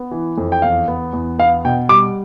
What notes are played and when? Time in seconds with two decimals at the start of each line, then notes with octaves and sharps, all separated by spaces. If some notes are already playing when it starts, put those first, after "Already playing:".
Already playing: B3
0.11 E3
0.38 F2
0.52 G5
0.62 E2 F5
0.88 B3
1.13 E2
1.38 B3 F5
1.64 B2 G5
1.89 G3 D6